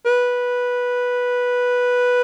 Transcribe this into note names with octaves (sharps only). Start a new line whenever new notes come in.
B4